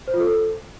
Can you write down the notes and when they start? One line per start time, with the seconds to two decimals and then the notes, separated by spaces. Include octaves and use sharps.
0.08 C5
0.14 F4
0.20 A4